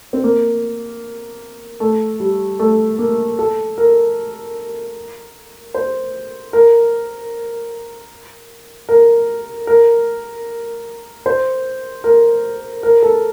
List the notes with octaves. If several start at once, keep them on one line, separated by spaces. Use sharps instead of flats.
C4
A#3
A3
G3
A3
A#3
A4
A#4
C5
A#4
A#4
A#4
C5
A#4
A#4
A4